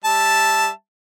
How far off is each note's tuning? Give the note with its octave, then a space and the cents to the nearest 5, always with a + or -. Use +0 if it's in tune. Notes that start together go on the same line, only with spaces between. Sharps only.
G3 +0 E5 +0 A5 +0